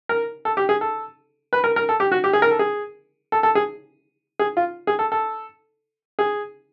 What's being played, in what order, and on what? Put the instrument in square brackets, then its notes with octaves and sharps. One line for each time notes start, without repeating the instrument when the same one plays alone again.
[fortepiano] A#4
A4
G4
G#4
A4
B4
A#4
A#4
A4
G4
F#4
G4
G#4
A#4
A4
G#4
A4
A4
G#4
G#4
F4
G#4
A4
A4
G#4